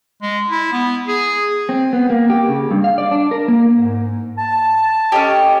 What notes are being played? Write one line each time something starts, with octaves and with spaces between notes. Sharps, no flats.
G#3
E4
B3
G#4
C4
B3
A#3
G4
C#3
G2
F5
D5
D4
A#4
A#3
G#2
A5
C#4 G4 A4 C#5 D#5